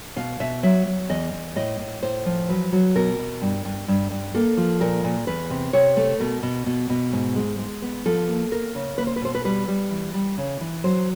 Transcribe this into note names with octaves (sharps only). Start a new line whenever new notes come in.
B2 F5
B2 E5
F#3 E5
F#3
E2 D#5
E2
A2 D#5
A2
A2 C5
F3
F#3 B4
F#3
B2 A#4
B2
G2
G2
G2
G2
A#3 A4
F3
A#2 A#4
A#2
E2 B4
C3
C3 C#5
A3
B2 A#4
B2
B2
B2
G#2
G#3
G#3
B3
F3 A4
A#3
A#3 A#4
C#3
A#3 B4
C5
B4
B2 C5
B4
G3 B4
G3
E3
G3
C#3
E3
F#3 C5